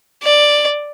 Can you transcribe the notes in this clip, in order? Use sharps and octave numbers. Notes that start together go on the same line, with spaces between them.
D5